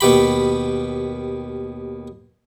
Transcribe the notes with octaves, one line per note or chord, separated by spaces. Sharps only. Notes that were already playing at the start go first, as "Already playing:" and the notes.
D#2 B2 G4 B5